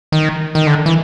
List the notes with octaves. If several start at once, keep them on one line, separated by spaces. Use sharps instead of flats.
D#3
D#3
D3
E3